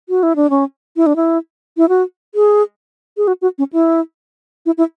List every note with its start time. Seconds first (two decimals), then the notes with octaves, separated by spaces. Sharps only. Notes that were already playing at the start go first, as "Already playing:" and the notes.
0.09 F#4
0.23 E4
0.36 D4
0.50 C#4
0.97 E4
1.06 D4
1.16 E4
1.77 E4
1.89 F#4
2.35 G#4
3.17 G#4
3.28 F#4
3.42 F#4
3.58 C#4
3.73 E4
4.66 E4
4.78 E4